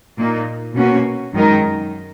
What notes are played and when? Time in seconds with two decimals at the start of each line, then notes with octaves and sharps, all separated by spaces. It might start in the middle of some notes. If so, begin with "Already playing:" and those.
0.18 A#2 A#3 D#4
0.75 B2 A#3 C#4 F#4
1.34 F#2 D#3 G#3 D#4 A#4